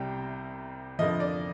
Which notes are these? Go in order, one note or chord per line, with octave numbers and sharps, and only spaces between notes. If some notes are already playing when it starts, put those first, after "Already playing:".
Already playing: C2 C3 G3 G5
F2 D3 F3 D#5
D5